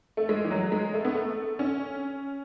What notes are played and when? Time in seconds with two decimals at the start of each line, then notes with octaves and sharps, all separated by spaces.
0.17 A3
0.29 G#3
0.44 E3
0.51 F#3
0.72 G#3
0.94 A3
1.05 B3
1.14 A3
1.59 C#4